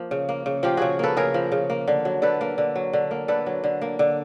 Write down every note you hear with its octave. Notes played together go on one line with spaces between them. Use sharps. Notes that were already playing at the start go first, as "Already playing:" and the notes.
Already playing: F3 A#3
C#3
A#3
C#3
F3 F4 G4
C#3 F#4 G#4
A#3 A4 B4
C#3 G#4 A#4
F3
C#3
A#3
D3
F#3
D3 A4 B4
A#3
D3
F#3
D3
A#3
D3 A4 B4
F#3
D3
A#3
D3